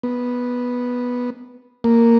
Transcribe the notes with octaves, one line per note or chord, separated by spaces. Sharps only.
B3
A#3